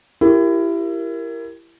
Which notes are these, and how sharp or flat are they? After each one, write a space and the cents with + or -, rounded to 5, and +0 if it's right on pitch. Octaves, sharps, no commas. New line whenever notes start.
E4 +25 G4 +0 A#4 +0